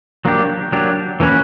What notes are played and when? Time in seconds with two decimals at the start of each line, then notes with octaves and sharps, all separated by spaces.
0.25 F#3 A#3 D4 G4
0.72 F#3 A#3 D4 G4
1.20 E3 A#3 C#4 F#4 B4